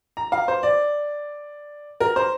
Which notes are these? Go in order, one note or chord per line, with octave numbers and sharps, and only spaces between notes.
A#5
F5
C5
D5
A#4
C5